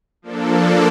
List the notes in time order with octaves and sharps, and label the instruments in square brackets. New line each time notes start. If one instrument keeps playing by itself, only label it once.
[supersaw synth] F3 A#3 D4 A4